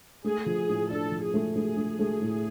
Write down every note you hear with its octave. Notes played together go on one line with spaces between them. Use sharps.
A3 G#4
F3
A2
D4 A4
F3
G#4
A3
A3 G#4
A3
A3
A2